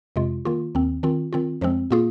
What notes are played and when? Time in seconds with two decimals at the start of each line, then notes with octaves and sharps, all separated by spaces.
0.16 F2 C3 G#3 F4
0.45 D#3 A#3 F4
0.75 D#2 D#3 C4
1.03 D#3 C4 F4
1.33 D#3 C4 F4
1.61 F2 F3 G#3 C4
1.91 A#2 A#3 F4 G#4